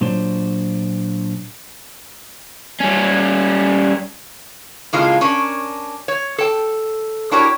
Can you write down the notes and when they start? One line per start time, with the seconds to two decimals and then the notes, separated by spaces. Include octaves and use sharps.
0.01 A#2 F#3 D4 C5
2.81 G3 C#4
4.93 A2 C#3 G#3 A#3 F4
5.21 C#4 D4 A#4
6.08 C#5
6.38 A4 G5
7.31 D4 E4 F#4 G4 A#4 C#5